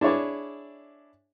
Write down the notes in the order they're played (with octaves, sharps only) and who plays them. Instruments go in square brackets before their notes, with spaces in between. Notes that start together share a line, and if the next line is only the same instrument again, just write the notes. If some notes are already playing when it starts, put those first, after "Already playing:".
[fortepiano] D4 E4 G#4 C#5 D5